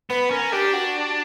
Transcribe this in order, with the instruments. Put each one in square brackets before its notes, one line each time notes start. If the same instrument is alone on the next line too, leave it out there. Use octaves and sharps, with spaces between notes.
[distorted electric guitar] B3 [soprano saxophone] B4
[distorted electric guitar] C#4 [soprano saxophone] A#4
[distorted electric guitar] D4 [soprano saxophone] G4
[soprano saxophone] F#4